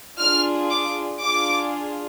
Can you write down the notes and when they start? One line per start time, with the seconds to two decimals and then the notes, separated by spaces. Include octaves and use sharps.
0.19 D4 F4 G#4 F6
0.70 D6
1.22 D4 F4 G#4 D6